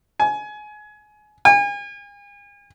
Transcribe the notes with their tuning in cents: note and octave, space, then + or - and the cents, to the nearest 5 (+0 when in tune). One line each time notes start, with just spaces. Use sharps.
G#5 +25
G#5 -40